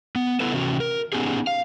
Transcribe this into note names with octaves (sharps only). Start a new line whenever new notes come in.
B3
B3 E4 A4 B4
C3 E3 C#4 F#4
A#4
B3 C#4 D#4 G4 G#4
F5